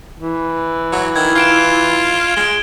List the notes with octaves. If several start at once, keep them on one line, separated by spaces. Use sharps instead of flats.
E3
F#3
D#3 G#6
F4 G#6 D7 E7
G#3 D7 G7